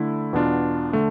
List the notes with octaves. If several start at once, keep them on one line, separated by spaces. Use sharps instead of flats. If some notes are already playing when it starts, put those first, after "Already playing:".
Already playing: D3 A3 E4
E2 B2 B3 D4 F4
D3 A3